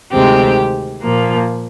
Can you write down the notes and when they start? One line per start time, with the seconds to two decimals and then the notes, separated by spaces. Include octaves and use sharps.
0.13 D2 C3 D#3 G#3 C4 G4
1.03 A#2 F3 A#3